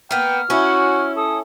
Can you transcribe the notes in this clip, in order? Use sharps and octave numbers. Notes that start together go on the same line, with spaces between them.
A#3 B3 G5 F6
C#4 E4 F#4
A4 D#6